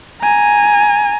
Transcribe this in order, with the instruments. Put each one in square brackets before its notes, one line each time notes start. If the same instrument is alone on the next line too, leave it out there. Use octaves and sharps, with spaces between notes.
[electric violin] G#5 A#5